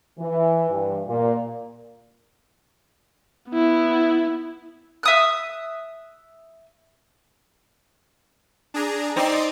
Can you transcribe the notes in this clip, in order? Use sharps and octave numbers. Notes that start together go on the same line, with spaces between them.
E3
G2
A#2
B3 E4
E5 D#6 F#6
D4 G#4 A#5
C4 D#4 D5 D#5 C6